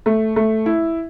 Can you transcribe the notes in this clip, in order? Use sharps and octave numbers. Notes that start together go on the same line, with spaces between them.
A3
A3
E4